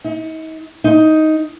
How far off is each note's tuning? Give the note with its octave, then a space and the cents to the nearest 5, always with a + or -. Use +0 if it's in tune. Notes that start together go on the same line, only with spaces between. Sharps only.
D#4 +40
D#4 +10